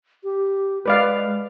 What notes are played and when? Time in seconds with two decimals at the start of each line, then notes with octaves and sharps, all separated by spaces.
0.24 G4
0.86 G#3 B4 D5 F5